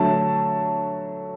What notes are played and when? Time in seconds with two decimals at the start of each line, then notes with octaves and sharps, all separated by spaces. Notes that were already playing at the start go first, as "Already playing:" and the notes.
Already playing: D3 F#3 A3 A5